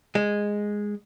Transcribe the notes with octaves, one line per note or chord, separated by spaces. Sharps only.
G#3